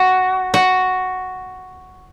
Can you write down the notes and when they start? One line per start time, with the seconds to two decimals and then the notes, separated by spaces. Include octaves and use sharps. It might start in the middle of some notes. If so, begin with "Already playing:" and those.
Already playing: F#4
0.54 F#4